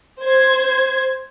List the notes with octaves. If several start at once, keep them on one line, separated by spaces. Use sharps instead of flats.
C5 G#6